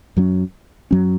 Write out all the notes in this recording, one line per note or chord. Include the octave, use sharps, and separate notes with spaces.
F#2 F#3 C#4
F#2 F#3 C#4